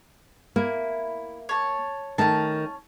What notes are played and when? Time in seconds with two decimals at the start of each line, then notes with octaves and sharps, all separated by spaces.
0.56 A#3 E4
1.49 C#5 A5
2.18 D#3 A3 C#4 A5